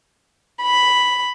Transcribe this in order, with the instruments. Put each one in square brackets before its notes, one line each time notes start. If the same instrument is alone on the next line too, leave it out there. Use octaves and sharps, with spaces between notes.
[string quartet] B5